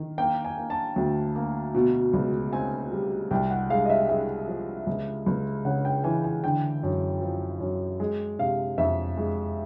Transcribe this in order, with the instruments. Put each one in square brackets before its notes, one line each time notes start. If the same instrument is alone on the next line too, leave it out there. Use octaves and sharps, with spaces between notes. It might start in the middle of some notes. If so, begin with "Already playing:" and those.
Already playing: [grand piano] D#3
A#3 G5
G#5
A#3
A5
D2
A#3
B2
C#2
C4 G#5
G3
C2 G5
F#5
G#3 F5
D#5
E5
G#3 E5
F3
C#2
C#2
C#3 F#5
G5
E3 G#5
G#5
D3 G5
F#2
F3
F#2
G#3
C3 F5
F2 E5
G#3